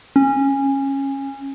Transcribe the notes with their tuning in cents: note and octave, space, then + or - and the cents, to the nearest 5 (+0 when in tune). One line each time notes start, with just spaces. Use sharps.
C#4 -20